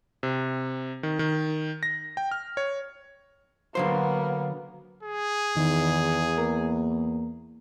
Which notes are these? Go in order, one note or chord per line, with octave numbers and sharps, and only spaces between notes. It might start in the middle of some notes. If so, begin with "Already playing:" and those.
C3
D#3
D#3
A#6
G5
F6
C#5
D3 F#3 A#3 B3 C5
G#4
E2 D#3
A#3